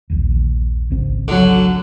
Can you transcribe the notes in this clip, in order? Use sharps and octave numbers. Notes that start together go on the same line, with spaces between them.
A#1 D#2
G#1 C#2 C4
D3 F#3